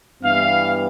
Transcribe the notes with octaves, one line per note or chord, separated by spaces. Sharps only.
G2 E3 G3 B3 F5